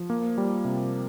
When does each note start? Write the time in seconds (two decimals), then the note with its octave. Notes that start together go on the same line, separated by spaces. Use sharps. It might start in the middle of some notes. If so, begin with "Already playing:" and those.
Already playing: F3
0.10 A#3
0.38 G3
0.65 C3